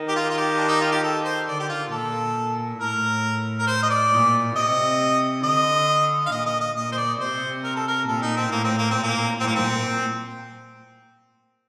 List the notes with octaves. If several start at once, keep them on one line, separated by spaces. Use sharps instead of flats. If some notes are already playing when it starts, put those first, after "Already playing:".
Already playing: D#3
G4
F4
F4
G4
D4
D#4
F4
G4
A4
C5
D3 D5
G4
F4
A#2 A4
A2 A#4
A#4
C5
D#5
D5
A#2
C3 D#5
D3 D#5
F5
A#2 D#5
D#5
D#5
A#2 D#5
C5
D5
C3 C5
A#4
A4
A#4
A#2 A4
D#4
C4
A2 A#3
C4
A#3
C4
A#2
A#3
A#2 C4
A#3
C4